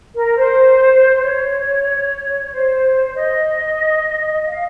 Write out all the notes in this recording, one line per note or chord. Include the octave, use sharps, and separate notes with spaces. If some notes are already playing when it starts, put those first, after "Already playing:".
A#4
C5
C#5
C#5
C5
D#5
F5